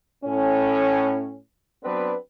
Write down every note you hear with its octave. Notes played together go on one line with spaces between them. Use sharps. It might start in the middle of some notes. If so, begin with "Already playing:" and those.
A2 C#4
F#3 B3 C4 D4 B4